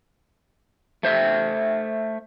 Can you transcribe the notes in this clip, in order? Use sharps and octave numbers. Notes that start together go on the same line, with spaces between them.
A3 C5 E5